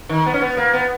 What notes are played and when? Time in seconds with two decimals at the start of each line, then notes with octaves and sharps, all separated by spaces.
0.09 D#3
0.26 B3
0.34 C#4
0.42 B3
0.57 A#3
0.73 B3